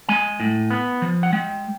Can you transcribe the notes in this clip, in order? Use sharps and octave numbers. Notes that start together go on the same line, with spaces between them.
G#3 G#5
A2
B3
F3
F#5
G#3 G5